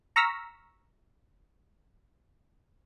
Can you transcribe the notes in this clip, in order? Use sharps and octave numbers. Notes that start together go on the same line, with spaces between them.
A#5 C#6 E6 F6 A#6 B6